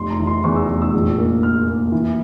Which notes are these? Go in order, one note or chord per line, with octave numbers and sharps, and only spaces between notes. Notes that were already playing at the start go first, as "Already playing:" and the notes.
Already playing: F1 C6
A#5
E3
C6
E2 C#6
E6
F1
E6
A#1
A#3
A#3 F6
A#3
E3